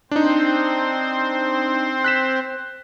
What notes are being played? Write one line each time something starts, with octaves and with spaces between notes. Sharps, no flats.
C4 D4 D#4 C5
F#6 B6 E7